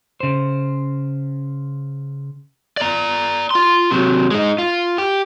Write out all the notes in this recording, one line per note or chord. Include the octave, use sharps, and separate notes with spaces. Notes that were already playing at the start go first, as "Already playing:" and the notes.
C#3 C5
D5 A#5
F4 C6
C3 F#3
G#3 D#4
F4
G4